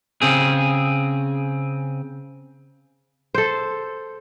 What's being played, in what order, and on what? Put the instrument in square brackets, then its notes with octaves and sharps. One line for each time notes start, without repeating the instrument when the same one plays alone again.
[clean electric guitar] C#3 C4 G#4
[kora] A4 C5